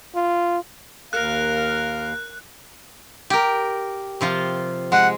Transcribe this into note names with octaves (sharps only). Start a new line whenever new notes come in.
F4
D#2 A#4 F5 F#6
G4 A#4
C3 F3 F4
G#3 F#5